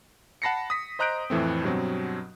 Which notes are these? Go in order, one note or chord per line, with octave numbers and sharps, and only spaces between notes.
F#5 A5 B5 A#6 C7 C#7
D#6 B6
C5 D#5 A#5 F#6 G6 D7
F2 A2 E3 A3 C4
G2 B2 F#3 C4